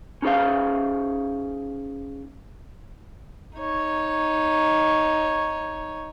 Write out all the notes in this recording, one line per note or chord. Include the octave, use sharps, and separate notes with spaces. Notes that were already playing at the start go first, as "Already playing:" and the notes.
C#4 D#4 G#4 C5 F5
D#4 C#5